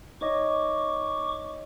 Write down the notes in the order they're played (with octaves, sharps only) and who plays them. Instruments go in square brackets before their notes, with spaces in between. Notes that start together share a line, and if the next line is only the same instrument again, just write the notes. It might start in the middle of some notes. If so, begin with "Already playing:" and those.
[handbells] D#4 C#5 D#5 [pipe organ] C#6 D6